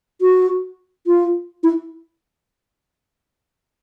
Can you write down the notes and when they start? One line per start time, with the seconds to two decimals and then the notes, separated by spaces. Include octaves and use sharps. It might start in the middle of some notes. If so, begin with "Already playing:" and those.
0.21 F#4
1.07 F4
1.63 E4